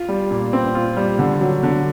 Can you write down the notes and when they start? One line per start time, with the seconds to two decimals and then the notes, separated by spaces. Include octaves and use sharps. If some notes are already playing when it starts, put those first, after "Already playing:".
Already playing: F4
0.09 G3
0.31 A#2
0.53 C4
0.75 F4
0.97 G3
1.19 D3
1.41 F#3
1.63 D3